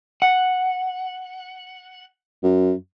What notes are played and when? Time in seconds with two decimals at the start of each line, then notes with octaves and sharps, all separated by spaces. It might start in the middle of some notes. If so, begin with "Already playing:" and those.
0.22 F#5
2.43 F#2